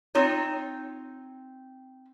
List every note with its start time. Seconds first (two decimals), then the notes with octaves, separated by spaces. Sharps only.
0.15 C4 D#4 F4 C#5